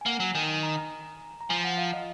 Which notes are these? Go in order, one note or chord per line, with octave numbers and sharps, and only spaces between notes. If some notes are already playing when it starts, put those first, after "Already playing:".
G#5
A#3 F#5
F#3 G#5
D#3 G#5
G#5
A#5
A#5
A#5
F3 G#5
F#5
F5
D#5